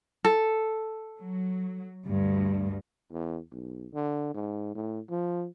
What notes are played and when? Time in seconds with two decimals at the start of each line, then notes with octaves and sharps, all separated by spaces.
0.25 A4
1.20 F#3
2.07 D2 G2
3.12 E2
3.52 B1
3.94 D3
4.34 G#2
4.75 A2
5.10 F3